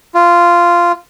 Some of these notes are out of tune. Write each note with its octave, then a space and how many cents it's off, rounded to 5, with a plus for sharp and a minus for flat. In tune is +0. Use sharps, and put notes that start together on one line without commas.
F4 -10